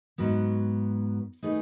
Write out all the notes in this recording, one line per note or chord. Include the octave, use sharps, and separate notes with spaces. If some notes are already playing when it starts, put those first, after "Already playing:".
G#2 F#3 B3
A3 D#4 G#4 B4